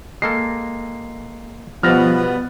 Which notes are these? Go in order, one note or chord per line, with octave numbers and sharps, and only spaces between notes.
G#3 A#3 A4 C7
B2 F3 G3 B3 F6 A6 A#6